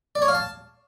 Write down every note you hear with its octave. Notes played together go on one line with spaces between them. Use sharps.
D5
C#5
F5
A5